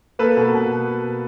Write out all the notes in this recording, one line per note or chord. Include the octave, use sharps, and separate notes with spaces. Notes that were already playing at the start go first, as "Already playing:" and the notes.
A#3 A4 B4
B2
B2